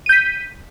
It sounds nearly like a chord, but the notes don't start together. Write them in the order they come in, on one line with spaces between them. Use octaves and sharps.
D#7 G6 B6